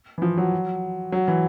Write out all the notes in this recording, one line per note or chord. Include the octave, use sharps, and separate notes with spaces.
E3
F3
F#3
F#3
E3